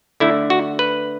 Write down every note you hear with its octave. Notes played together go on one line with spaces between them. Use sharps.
D3 A3 E4
F#4
B4